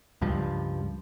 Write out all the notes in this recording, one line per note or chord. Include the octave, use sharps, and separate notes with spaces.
C#2 G2 F3